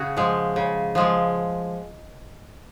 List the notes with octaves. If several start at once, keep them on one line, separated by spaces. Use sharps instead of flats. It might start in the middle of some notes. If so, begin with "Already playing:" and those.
Already playing: C#3 F#4 G#4
F3 G#3
C#3
F3 G#3